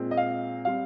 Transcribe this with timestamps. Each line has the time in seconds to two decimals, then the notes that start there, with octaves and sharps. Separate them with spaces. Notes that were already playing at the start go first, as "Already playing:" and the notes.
Already playing: A#2 G#3 C4
0.11 D#5
0.17 F5
0.65 G3 C4 F5